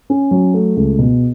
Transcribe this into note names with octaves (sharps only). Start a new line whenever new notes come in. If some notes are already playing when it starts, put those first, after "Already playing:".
C#4
F#3
A3
C#2
B2